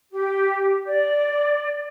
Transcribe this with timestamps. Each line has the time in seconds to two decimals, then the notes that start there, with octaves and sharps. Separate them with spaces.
0.11 G4
0.86 D5